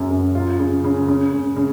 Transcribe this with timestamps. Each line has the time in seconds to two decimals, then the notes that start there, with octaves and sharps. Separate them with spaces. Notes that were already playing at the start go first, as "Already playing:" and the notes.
Already playing: F#2 C#3
0.11 F#2
0.35 F4
0.59 C#3
0.84 C#3
1.08 C#3
1.33 C#3
1.56 C#3